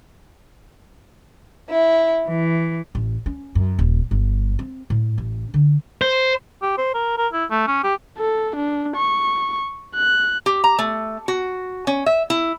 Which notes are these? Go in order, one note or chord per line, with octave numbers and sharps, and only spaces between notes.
E4
E3
A1
C#4
F#2
D#1
G1
C4
A2
A1
D3
C5
G4
C5
A#4
A#4
E4
A3
C#4
G4
A4
D4
C#6
F#6
G4
A#5
A3
F#4
C#4
E5
E4